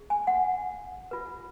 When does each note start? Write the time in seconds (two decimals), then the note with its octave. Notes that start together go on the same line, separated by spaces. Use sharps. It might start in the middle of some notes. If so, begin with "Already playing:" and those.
Already playing: G#4
0.10 G#5
0.27 F#5
1.11 F4 B4